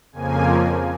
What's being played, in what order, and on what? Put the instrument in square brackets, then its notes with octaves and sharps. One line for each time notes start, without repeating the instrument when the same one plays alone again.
[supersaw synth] F2 C#3 F3 A#3 G#5